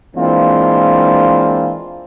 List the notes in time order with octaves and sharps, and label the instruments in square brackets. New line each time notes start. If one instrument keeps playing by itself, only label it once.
[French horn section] E3 G#3 A#3 C4 D4 F4